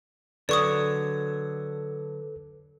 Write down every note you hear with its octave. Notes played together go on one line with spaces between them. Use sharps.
D3 F#3 A4 B4 D5 C#6 D#6